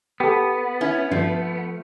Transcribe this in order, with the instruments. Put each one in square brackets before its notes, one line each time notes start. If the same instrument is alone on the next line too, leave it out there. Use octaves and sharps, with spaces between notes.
[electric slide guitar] B3 [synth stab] G4 A4
[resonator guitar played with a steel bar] C#4 E4
[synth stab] G2 [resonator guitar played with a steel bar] F3 A3